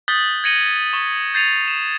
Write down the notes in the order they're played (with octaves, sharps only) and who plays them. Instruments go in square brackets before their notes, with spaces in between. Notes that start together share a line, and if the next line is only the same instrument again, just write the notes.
[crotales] D#6 F#6 G6 A6 B6 G7
G#6 A#6 C#7 D#7 F#7 G7
C#6 G7
G6 A6 C7 C#7 D#7 F7
E7